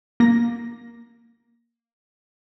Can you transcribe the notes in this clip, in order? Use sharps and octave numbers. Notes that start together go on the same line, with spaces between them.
A#3 A#6